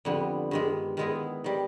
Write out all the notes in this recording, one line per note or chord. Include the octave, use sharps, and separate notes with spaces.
F2 D3 G3 B3 D4
G2 D#3 G#3
D#3 G#3 B3 E4
D#3 G3